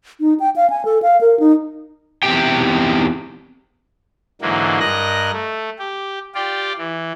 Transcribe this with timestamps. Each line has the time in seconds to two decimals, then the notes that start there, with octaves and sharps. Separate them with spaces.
0.20 D#4
0.40 G5
0.56 F5
0.70 G#5
0.85 A4
1.02 F5
1.21 A#4
1.40 D#4
2.23 E2 G2 C4 G4 G5
4.41 G#2 D3 E3 F#3 A#3
4.80 G2 A#4 D#5 F#6 A#6
5.32 A3
5.78 G4
6.35 F4 G4 D5
6.78 E3